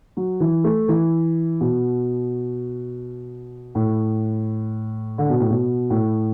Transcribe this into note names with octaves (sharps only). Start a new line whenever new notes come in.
F#3
E3
A3
E3
B2
A2
D3
B2
A2
B2
A2